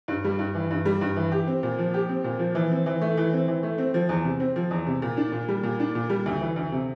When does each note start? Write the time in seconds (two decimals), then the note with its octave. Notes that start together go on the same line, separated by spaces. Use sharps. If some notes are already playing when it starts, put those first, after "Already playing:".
0.08 G2
0.24 G3
0.39 G2
0.55 E3
0.71 G2
0.85 G3
1.01 G2
1.17 E3
1.32 G4
1.47 C4
1.63 A#2
1.78 F3
1.94 G4
2.09 C4
2.24 A#2
2.39 F3
2.55 E3
2.71 C4
2.86 E3
3.01 A3
3.17 E3
3.33 C4
3.48 E3
3.63 A3
3.78 C4
3.94 F3
4.09 E2
4.24 C3
4.40 C4
4.56 F3
4.71 E2
4.87 C3
5.02 A#2
5.17 D4
5.32 A#2
5.48 G3
5.63 A#2
5.80 D4
5.95 A#2
6.10 G3
6.26 D2
6.41 E3
6.56 D2
6.72 C3